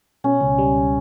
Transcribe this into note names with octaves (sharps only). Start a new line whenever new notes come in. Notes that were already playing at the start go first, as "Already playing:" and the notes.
B2 C#4
C#2
G3